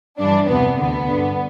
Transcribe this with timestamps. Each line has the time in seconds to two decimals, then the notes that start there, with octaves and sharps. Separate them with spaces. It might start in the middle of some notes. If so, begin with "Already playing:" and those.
0.18 G2 E3 D4
0.48 E2 C3 E3 B3
0.78 D2 D3 B3
1.07 G2 D3